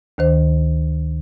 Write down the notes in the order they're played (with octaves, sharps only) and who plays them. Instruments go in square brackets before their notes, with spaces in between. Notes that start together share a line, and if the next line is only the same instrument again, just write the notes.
[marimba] D2 D#3 C5